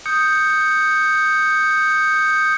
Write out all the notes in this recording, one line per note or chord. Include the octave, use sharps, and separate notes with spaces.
D#6 G6 C#7